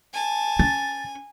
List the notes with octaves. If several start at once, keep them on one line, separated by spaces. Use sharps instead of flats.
G#5 A5
C#4 A6